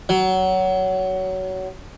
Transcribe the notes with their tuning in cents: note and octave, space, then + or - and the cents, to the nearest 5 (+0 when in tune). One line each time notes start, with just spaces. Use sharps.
F#3 +20